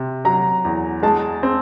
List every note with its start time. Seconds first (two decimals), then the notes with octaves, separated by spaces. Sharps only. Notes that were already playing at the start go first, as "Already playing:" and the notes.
Already playing: C3
0.25 F#3 A#5
0.65 E2
1.03 G#3 A5
1.43 C4